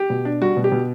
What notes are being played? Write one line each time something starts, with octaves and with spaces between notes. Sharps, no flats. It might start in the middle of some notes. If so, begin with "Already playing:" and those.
Already playing: G4
B2
D4
G3 F#4
B2
G4
B2